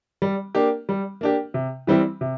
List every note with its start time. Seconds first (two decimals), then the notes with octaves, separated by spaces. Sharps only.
0.22 G3
0.55 A#3 D4 G4
0.89 G3
1.21 A#3 D4 G4
1.54 C3
1.87 E3 G3 C4 E4
2.21 C3